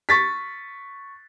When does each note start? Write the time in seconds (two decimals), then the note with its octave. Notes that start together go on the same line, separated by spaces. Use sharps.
0.09 C#6 A6 B6